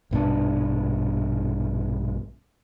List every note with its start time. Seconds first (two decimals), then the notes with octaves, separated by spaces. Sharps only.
0.11 A#1 G2 B2 D4